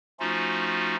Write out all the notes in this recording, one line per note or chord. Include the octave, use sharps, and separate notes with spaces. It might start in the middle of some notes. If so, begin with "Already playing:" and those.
F3 A3 C#4 D#4 F4 F#4